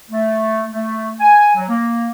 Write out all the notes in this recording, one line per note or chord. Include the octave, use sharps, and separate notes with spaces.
A3
A3
G#5
F#3
A#3